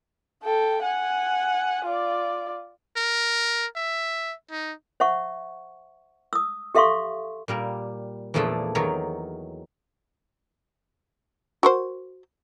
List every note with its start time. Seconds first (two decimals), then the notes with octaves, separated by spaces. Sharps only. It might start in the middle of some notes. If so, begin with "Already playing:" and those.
0.43 A4 G5
0.83 F#5 G#5
1.85 F4 D5
2.97 A#4
3.76 E5
4.51 D#4
5.00 C5 E5 F#5 C#6
6.33 D#6 E6
6.75 G4 A4 E5 F5 C6 C#6
7.48 A#2 G3 A#4
8.34 E2 A#2 F3 A3 D4 E4
8.75 E2 D#3 F#3 A#4 C#5 A#5
11.63 F#4 A#4 C5